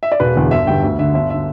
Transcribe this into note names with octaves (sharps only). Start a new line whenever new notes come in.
E5
D5
E1 B4
E2 D3
G1 E5
G2 D3 G5
D2 E5
D3 E5
G1 E5
D3 E5